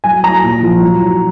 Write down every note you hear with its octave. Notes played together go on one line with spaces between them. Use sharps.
F#3 G#5
F#3 A#5
A#2
F3
F#3
F#3